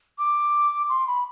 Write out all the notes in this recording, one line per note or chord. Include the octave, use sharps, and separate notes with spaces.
D6
C6
B5